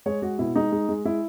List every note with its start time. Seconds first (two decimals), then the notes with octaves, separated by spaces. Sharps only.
0.06 G#3 C#5
0.22 G#3 F#4
0.39 B2 E4
0.56 G#3 D#4
0.72 G#3
0.89 G#3
1.05 G#3 E4